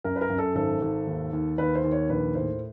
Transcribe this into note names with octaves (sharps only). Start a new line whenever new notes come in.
F#2 A#4
B4
A#4
F#2
A4
G#1 A4
G#1
D#2
D#2
D#2 B4
C5
D#2
C#5
A#1 B4
A2 C5